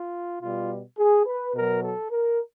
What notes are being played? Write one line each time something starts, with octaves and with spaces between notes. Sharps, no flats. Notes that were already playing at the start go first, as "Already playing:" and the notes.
Already playing: F4
B2 G3 F4
G#4
B4
B2 F#3 A#4
A4
A#4